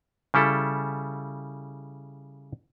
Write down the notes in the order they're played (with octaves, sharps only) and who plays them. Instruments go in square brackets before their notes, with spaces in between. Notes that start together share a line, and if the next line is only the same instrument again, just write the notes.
[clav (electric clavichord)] C#3 G3 E4 A4